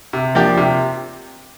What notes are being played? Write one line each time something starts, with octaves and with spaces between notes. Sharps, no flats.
C3
F3 A#3 D4 G4
C3